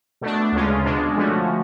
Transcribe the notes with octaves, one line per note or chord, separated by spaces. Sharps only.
B2 A3 D4
D2 C#3 G#3 C#4 F4
B2 G#3 D4 F4
D3 F3 A3 C#4 F#4